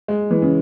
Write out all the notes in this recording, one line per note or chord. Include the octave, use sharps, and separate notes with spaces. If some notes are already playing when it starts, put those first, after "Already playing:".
G#3
E3
C#3